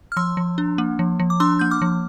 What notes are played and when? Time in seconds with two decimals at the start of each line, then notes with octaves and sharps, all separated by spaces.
0.12 F6
0.17 F3 C6 E6
0.37 F3
0.58 D4
0.78 A#3
0.99 F3
1.20 F3
1.30 D6
1.40 D4 C6 E6
1.59 A#3 G6
1.71 D6 F6
1.82 F3